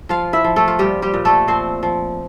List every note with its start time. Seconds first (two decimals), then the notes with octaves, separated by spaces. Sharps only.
0.09 F3 F4 F5
0.33 E4 E5
0.44 F3
0.56 A3 A4
0.68 F4
0.79 A#2 G3 G4
1.02 G3 G4
1.14 A#2
1.25 A3 A4
1.48 F3 C4 C5
1.83 F3